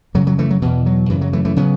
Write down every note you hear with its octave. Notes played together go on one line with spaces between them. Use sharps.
F#2 C#3 F#3
F#3
E3 A3
F#3
E2 B2 E3
F#3
F#2 C#3 E3
F#3
E3 A3
E3 A3
C#3 F#3 B3